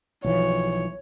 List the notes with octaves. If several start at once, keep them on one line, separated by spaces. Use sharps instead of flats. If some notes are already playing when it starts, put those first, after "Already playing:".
B1 E3 F3 C#5